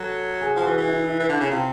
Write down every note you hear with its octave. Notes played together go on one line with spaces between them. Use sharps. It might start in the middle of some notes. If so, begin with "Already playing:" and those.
Already playing: F#3 A4
G#4 G#5
F3 F#4 F#5
E3
E3
E4 E5
E4 E5
E3
D3
C#3
C3 F4 F5